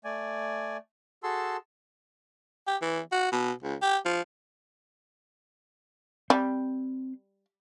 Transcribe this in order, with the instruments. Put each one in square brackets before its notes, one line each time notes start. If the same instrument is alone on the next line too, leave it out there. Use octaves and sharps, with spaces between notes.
[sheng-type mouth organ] A3 D5 G#5
F#4 G#4 A4 A5 C6 E6
[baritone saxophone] G4
E3
F#4
B2
C#2
G4
F3
[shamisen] G3 [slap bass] C4